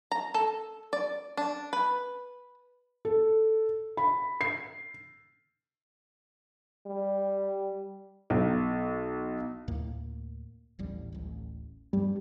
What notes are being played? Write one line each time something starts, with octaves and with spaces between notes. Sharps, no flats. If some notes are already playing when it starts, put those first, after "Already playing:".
A#5
A4
D5
D4
B4
A4
B5
C7
G3
B1
D2 A2 A#3
D#1 A1 G3
D1 A1
G2 G3